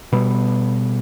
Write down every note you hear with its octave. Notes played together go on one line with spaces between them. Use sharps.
B2 G3 B3